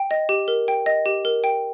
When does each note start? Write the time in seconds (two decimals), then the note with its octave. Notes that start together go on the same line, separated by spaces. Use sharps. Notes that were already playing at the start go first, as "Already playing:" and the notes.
Already playing: G5
0.11 D#5
0.29 G4
0.48 A#4
0.68 G5
0.86 D#5
1.06 G4
1.25 A#4
1.44 G5